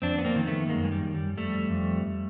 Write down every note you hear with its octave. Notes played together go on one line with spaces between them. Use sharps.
F2 C4 D4
B3
A#3 C4
D#3
A3 B3
F#2 G#3 A#3
G#3
G3
F#2
G3
F2 G3 A3
F2